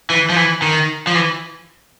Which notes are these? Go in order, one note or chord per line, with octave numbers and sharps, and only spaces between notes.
E3
F3
E3
D#3
F3
E3